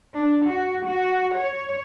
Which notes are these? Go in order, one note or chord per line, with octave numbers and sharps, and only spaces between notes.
D4
F#4
F#4
C#5